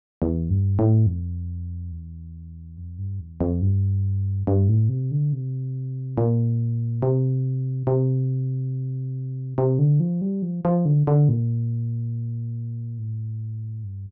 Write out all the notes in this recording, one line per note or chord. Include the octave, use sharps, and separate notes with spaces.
E2
G2
A2
F2
E2
F2
G2
E2
F2
G2
G2
A2
C3
D3
C3
A#2
C3
C3
C3
D3
F3
G3
F3
F3
D3
D3
A#2
A2
G2